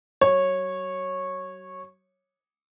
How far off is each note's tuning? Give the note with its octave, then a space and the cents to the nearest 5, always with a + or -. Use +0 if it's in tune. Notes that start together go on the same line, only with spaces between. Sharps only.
F#3 +40 C#5 -15